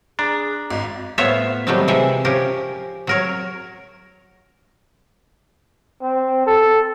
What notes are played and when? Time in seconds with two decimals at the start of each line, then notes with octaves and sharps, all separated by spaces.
0.19 D4 G#4 A#5
0.70 G#1 D#5
1.18 A2 B3 F4 C5 C#5 E5
1.67 D#3 F#3 G3 A3 C4 D#4
1.88 C3 E3 F3 G#3 E5
2.25 F3 C#4 G4 A#4
3.07 F#3 A#4 C#5
6.02 C4
6.47 A4